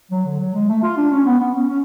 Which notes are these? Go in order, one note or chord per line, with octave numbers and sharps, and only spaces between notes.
F#3
D3
F#3
G#3
A3
F4
D4
C#4
B3
B3
C#4
C#4